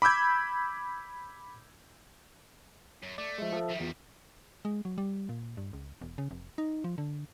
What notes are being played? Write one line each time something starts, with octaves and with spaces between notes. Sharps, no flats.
B5 D6 E6 G6 G#6
F#2
A3 D5
F3 G#3 E5
F3 A4
D#3 G3
E2 F4
G#3
F#3
G3
A#2
G2
C#2
E1
C#3
F1
D#4
F3
D3